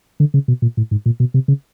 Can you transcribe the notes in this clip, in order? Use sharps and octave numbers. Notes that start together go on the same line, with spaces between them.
D3
C#3
B2
A#2
A2
G#2
A#2
B2
C3
C#3